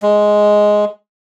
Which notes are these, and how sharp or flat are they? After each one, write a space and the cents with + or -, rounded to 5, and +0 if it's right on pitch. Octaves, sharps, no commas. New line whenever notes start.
G#3 +5